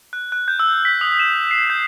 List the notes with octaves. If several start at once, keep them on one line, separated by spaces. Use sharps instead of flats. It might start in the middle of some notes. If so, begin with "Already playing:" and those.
F#6
F#6
G6
E6
B6
D#6
E7
C7
G6